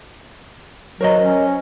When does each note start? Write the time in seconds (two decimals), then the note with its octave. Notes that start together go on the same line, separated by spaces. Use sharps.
1.01 F#3 A#4 C5 D#5
1.19 C#4